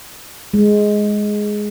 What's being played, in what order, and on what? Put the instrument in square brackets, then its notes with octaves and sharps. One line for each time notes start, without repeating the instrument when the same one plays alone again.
[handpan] G#3